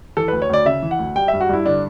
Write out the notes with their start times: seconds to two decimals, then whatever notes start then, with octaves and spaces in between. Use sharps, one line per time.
0.17 E3 A4
0.28 D2 B4
0.42 C#5
0.49 D2 D5
0.66 C#3 E5
0.83 E3
0.91 F#5
0.99 D2
1.16 G3 G5
1.28 E5
1.33 G2
1.41 F#4
1.49 G2 E4
1.66 D3 D4